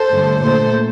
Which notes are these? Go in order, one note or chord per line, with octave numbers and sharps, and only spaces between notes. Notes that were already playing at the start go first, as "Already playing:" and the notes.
Already playing: A4 C5
G2 D3 A3
A#2 A3 A4 C5